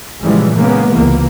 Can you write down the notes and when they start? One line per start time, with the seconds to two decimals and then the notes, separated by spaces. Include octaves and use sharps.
0.22 A#2 C#3 E3 F3 G3 G#3
0.55 C#3 G#3 A#3 B3
0.92 C#2 C3 E3 A#3